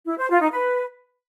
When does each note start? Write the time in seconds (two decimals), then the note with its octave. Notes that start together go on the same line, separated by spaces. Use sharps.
0.07 E4
0.18 C5
0.29 F4
0.41 D#4
0.52 B4